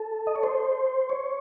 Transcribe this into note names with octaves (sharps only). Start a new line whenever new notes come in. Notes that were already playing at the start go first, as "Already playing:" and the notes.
Already playing: A4
D#5
C#5
C5
C#5